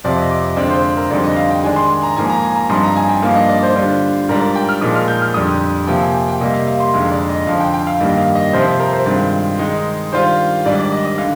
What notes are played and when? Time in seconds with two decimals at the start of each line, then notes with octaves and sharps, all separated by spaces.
0.04 F2 C3 F3 C4 D5
0.17 D#5
0.31 D6
0.45 D#5
0.57 F2 D3 G#3 C4 F4 D5
0.70 C5
0.97 A#4
1.10 F2 D3 G3 C4 D#4 D5
1.23 D#5
1.36 F5
1.51 G5
1.63 D#3 G#3 D4 G#5
1.76 C6
1.90 G#5
2.03 A#5
2.16 G#2 F3 A#3 G#5
2.30 A#5
2.43 G#5
2.56 A#5
2.69 G2 F3 C4 D#4 C6
2.83 A#5
2.96 G#5
3.09 G5
3.23 G2 F3 A#3 D#4 F5
3.35 D#5
3.49 D5
3.63 C5
3.75 D3 G3 D4 F4
4.29 G#2 G3 D4 F4 A#4
4.41 A#4
4.56 G5
4.69 F6
4.81 A#2 F3 G#3 D#4 D#6
4.96 F6
5.08 G6
5.22 F6
5.34 F2 D3 G3 D#6
5.87 C3 F3 A#3 G5
6.02 G#5
6.14 G5
6.28 G5
6.41 C3 G3 A#3 D#5
6.54 F5
6.67 F5
6.80 C6
6.94 F2 D3 G#3 D#4 F5
7.12 D5
7.29 D#5
7.46 F2 D3 F3 F5
7.60 G5
7.74 G5
7.87 F5
8.01 G2 D#3 G3 A#3 D#5
8.18 F5
8.35 D#5
8.53 C3 F3 C4 F4 C5
8.80 A#4
8.93 C5
9.06 G2 D#3 G#3 C4 F4
9.59 D#3 G#3 D#4
10.13 D#3 G3 D4 F4 C5
10.65 G#2 D#3 G3 D4 D5
10.79 D5
10.92 D#5
11.05 D#5
11.18 D3 F5